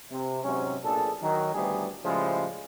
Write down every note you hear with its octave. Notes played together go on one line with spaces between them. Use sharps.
C3
G#2 C3 F#3 C#4
B1 A#2 D4 G#4 A4
D#3 F#3
A1 D2 G3 A3 B3 G#4
A2 C#3 F3 G3 G#3